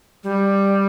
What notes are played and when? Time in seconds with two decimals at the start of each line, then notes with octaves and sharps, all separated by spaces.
0.24 G3